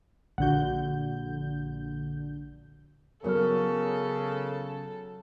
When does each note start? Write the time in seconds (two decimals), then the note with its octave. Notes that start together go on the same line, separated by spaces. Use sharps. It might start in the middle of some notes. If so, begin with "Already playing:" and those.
0.38 A#1 D3 F#4 F#5 G6
3.24 C#3 F#3 B3 A4 A#4 C#5 F6